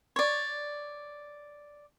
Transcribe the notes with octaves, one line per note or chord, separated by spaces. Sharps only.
C#5 D5